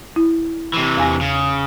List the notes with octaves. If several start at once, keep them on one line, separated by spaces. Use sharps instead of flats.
E4
C3 E3
E2 G#5 A#6
C#3